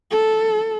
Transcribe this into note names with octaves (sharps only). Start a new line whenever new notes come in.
A4